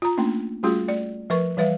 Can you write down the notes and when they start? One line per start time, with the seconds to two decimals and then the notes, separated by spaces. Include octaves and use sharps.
0.02 F4 A#5
0.17 A3 A#3 C#4 D4
0.63 G3 A3 C#4 F4 F#4 G#4
0.88 A3 D5
1.30 F3 A#4 B4 C#6
1.57 E3 G3 B4 E5 F5